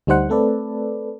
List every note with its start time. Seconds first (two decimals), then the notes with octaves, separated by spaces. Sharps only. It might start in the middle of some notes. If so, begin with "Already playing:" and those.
0.07 D2 G3 D#4 C5 F#5
0.29 A3 C4 A4 B4 D5